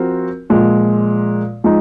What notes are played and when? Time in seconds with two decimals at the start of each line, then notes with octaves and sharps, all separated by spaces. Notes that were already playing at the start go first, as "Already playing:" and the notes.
Already playing: F3 C4 F#4 A#4
0.50 A#2 F3 G#3
1.64 F3 G#3 D#4